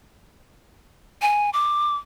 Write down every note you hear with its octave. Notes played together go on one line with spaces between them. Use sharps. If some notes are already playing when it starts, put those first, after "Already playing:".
G#5
D6